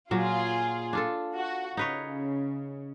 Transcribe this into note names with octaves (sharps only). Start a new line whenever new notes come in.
A#2 F#3 F4 G#4
D4 F4 A4
F#4
C#3 D#4 B4 C#5